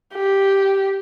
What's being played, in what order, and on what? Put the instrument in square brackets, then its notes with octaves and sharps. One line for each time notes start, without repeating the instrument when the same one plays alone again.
[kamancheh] G4